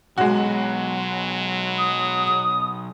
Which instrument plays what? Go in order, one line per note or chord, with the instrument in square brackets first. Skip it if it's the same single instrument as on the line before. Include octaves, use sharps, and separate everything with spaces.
[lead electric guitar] B1 [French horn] F#3 [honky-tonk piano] G#3 F#4
[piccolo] D#6